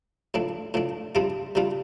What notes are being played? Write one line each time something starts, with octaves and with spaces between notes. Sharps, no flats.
A2 F3 D4
A2 F3 D4
C3 G3 D4 F4
C3 G3 D4 F4